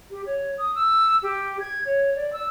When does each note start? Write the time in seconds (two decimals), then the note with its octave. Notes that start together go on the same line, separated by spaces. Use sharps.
0.11 G4
0.26 C#5
0.58 D#6
0.75 E6
1.23 G4
1.60 G#6
1.85 C#5
2.15 D5
2.33 E6